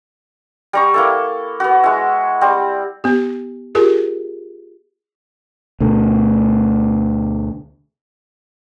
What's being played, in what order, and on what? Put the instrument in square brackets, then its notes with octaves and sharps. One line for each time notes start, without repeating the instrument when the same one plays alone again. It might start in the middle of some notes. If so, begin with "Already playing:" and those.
[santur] G3 A#5 C#6
A#3 E4 A4
B3 F#4
G#3 E4
G3 C4
[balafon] B3 G4
F4 G4 G#4 A#4
[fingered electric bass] D2 B2 A3